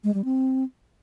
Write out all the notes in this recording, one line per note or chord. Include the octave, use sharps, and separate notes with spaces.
G#3
G3
C4